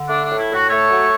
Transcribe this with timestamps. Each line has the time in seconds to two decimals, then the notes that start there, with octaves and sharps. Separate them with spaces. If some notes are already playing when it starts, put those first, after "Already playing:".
Already playing: D3
0.09 A3 D4
0.23 D4
0.29 A2
0.39 E4
0.49 A2 F#4
0.69 A3 C#5
0.89 F#3